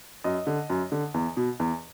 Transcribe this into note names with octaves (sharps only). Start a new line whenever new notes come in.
F#2 D#5
D3
F#2
D3
E2
B2
E2